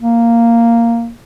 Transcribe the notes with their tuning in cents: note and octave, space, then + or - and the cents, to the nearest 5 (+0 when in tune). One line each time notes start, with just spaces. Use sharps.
A#3 -5